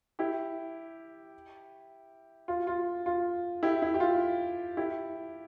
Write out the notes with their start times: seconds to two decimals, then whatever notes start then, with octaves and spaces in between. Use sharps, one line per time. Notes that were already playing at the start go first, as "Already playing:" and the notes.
0.19 E4 G4
2.48 F4
2.67 F4
3.06 F4
3.63 E4 G4
3.82 E4
3.94 G4
4.00 F4
4.77 E4 G4